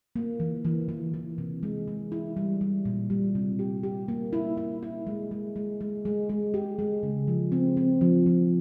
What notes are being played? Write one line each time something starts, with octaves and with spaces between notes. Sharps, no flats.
A#3
E3
E3
E3
E3
C3
G#3
E3
E4
G3
G3
A#2
G3
C3
G4
G4
A#3
E4
E4
E4
G#3
G#3
G#3
G#3
G#3
G#3
G4
G#3
C#3
F3
C4
C4
F3
F3